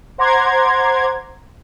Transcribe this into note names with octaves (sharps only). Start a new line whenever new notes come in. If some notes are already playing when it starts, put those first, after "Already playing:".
C5 F#5 A#5 C6 D6 G#6